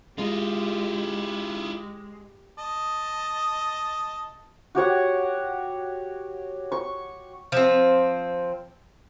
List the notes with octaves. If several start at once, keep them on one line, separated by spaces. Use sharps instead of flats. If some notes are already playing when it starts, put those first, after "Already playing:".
G#3 E4 F4 G4
D#5 A5
F#4 G4 C#5 F#5
C#6
F3 C4